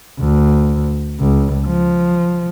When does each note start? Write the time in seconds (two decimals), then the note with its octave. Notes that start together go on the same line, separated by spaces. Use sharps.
0.19 D2
1.20 C#2
1.67 F3